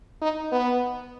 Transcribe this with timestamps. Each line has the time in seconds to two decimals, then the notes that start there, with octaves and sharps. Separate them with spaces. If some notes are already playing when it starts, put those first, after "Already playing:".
0.21 D#4
0.52 B3